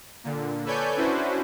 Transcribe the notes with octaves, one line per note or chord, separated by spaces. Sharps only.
A#2 D3
A4 B4 C#5 D5 G#5 G6
C#4 D4 E4 F#4 B4 C5